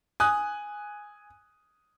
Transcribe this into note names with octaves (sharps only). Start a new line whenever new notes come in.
G#5 D#6 F#6